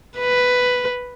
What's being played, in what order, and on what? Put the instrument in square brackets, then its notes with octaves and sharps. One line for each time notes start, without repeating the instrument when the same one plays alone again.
[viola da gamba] B4